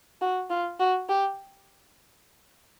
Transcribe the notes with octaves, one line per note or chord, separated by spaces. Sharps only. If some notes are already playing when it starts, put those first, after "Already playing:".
F#4
F4
F#4
G4